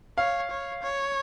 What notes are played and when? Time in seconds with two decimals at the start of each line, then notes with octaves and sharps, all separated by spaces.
0.18 C#5 F5
0.51 C#5
0.82 C#5